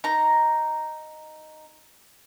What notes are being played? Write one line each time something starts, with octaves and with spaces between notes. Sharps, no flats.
D#4 A#5